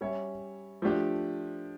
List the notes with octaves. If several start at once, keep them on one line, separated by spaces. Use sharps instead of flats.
G3 C#4 G4 C#5 E5
F3 A3 D4 G4